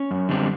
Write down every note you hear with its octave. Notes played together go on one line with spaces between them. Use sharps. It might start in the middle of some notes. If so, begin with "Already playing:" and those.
Already playing: C#4
F#2
D3 G3 C4